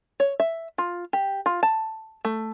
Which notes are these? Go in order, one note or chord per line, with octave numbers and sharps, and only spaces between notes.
C#5
E5
F4
G4
F4
A5
A3